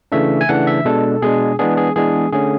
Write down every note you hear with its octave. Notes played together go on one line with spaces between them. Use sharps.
C#3 E3 A3 D4 E5
G#5
C#3 E3 A3 D4 F#5
E5
B2 G#3 D4 A4
B2 G#3 D4 G#4
E3 G#3 B3 D4 G#4
G#4
E3 G#3 B3 D4 G#4
D3 A3 C#4 G#4